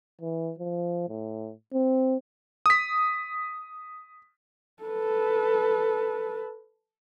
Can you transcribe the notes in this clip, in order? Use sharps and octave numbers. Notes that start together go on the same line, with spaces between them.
E3
F3
A2
C4
D#6 B6
A4 B4